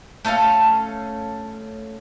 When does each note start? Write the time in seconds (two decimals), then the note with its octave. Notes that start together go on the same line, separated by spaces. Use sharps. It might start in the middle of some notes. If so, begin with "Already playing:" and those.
0.25 A3 C#4 A4 F5